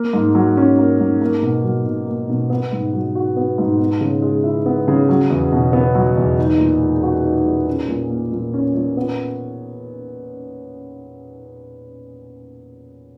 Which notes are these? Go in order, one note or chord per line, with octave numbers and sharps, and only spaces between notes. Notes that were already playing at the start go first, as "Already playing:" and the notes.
Already playing: A#3
G#2
F#3
C#4
A#3
G#2
A#3
B2
F#3
B2
A#3
B2
B3
G#2
F#3
F#4
B3
G#2
B3
C#3
G#3
E4
B3
C#3
F#3
E2
B2
B3
F#3
E2
D#4
A#2
G#3
F#4
D#4
A#2
C#4
A#2
A#3
A#2
C#4
A#2
B3